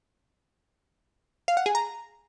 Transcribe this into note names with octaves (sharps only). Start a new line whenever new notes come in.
F5
F#5
G#4
A#5